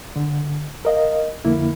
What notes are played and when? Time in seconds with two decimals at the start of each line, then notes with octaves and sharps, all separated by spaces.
0.16 D3
0.85 A#4 D#5 F5
1.45 F2 D3 A#3 E4